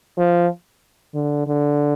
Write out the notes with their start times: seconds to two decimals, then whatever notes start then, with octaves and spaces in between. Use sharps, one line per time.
0.18 F3
1.14 D3
1.47 D3